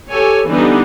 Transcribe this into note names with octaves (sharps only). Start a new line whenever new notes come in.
G4 A4 C#5 G#5
D3 E3 G3 B3 D4 D#4